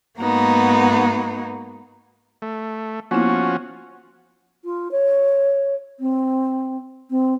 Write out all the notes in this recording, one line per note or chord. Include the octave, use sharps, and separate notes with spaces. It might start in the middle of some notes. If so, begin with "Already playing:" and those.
G#2 A#3 B3 D#4 F#4
A3
F3 A#3 B3 C#4 E4 F#4
F4
C#5
C4
C4